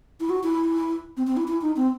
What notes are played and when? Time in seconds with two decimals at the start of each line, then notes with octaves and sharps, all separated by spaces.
0.20 E4
0.30 F#4
0.44 E4
1.17 C4
1.27 C4
1.37 E4
1.48 E4
1.62 D#4
1.76 C4